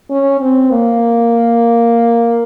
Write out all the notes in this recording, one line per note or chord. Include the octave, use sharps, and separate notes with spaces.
C#4
C4
A#3